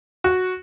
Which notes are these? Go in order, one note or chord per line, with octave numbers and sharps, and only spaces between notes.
F#4